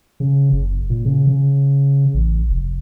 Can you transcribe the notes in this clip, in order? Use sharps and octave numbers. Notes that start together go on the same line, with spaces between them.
C#3
F#1
A#2
C#3
C#3
A1
F1